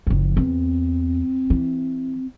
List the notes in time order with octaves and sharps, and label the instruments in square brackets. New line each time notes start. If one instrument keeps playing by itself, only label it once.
[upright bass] F#1 F3
[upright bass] E2 [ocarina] C4
[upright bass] E3